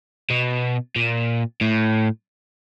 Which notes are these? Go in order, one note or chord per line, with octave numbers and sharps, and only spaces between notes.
B2
A#2
A2